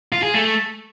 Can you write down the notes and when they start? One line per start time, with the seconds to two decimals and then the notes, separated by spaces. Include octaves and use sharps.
0.12 F4
0.23 G#4
0.34 A3